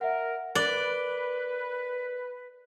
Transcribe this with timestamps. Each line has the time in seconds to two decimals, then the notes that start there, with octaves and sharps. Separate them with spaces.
0.01 A#4 E5 F#5
0.55 A#4 B4 D5 F#6 G7